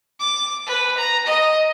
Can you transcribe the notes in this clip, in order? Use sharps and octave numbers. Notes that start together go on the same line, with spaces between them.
D6
B4
A#5
D#5